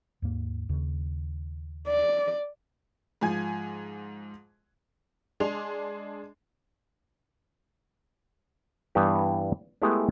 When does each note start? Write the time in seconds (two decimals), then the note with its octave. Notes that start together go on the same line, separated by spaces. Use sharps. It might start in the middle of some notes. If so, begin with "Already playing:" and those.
0.22 D#2 G#2 A#3
0.69 D#2 C#3
1.88 D5
3.21 G#2 F3 G#5 G#6
5.40 G#3 D4 G#4 C6 F7
8.95 G2 E3 B3 G4
9.82 G#3 A3 B3 E4 G4 G#4